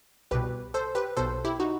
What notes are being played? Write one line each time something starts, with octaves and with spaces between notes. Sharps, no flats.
C2 B2 G4 B4
A4 C5
G4 B4
B1 B2 A4 C5
E4 G4
D#4 F#4